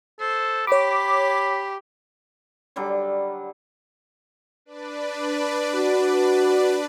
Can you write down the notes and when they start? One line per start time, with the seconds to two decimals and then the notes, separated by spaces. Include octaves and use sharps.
0.20 A4 C5
0.67 G4 C#5 B5 D6
2.76 D3 F#3 G3 D6
4.65 D4 B4 D5
5.75 F#4